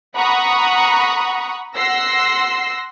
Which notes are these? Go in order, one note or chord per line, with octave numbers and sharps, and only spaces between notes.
F#5 A#5 B5 C#6 D#6
F#5 C6 E6 A#6 C7